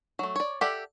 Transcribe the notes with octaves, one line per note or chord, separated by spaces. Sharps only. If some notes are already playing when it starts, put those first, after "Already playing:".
F#3 A3
C#5 D5
G4 A4 D5 E5 F#5